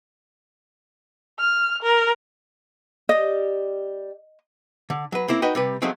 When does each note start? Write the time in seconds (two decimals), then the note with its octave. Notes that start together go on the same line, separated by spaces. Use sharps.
1.39 F6
1.82 A#4
3.09 G3 G4 D#5
4.90 D3
5.12 F#3 B4
5.28 A#3 C4 E4 A#4
5.42 D#4 F#4 B4 D#5 G5
5.55 C3 G3 B4
5.82 F3 F#3 G#3 A3 C4